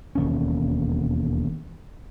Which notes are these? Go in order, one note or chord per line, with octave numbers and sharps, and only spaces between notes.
E1 D#2 C#4